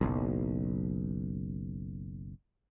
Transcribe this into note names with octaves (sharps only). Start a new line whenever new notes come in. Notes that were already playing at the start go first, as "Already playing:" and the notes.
F#1 B1